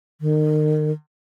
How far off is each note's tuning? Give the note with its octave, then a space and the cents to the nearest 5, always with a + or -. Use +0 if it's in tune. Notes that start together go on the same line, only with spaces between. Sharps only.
D#3 -30